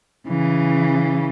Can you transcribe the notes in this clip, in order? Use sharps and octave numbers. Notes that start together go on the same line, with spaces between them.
C#3 E3